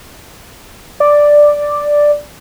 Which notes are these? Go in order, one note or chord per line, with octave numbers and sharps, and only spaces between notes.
D5